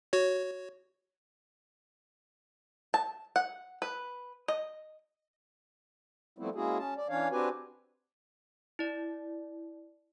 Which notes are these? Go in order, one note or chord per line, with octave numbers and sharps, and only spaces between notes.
F#4 C#5
A5
F#5
B4
D#5
F3 G3 A3 B3 C4 E4
G#3 A#3 C#4 E4 F#4 G#4
C#4 A5
D5
E3 C#4 D4 C#5 F5
C4 D4 F#4 G4 B4 G#5
E4 D5